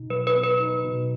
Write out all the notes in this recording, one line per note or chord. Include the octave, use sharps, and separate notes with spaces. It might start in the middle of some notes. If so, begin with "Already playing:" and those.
Already playing: B2 D#4
F#3 B4
B4
B3
B4
D#4
B2